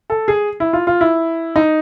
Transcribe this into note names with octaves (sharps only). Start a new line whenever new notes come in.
A4
G#4
E4
F4
F4
E4
D#4